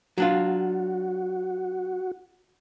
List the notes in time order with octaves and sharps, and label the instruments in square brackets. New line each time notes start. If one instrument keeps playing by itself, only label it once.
[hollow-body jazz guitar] F#3 D4 F4 [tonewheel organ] F#4